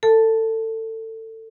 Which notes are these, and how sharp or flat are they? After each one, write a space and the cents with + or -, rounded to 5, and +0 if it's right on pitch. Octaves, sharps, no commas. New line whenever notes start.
A4 +25 A5 +0